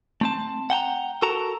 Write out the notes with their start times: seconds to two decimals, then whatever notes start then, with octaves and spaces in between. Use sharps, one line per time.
0.21 A3 C4 A5
0.70 F#5 G5 A5 A#5
1.22 F#4 A4 A#4 A5 A#5